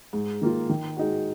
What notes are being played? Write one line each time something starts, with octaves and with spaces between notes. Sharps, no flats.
G#2
D#3 A#3 F4
D#3
G#3 D#4 F#4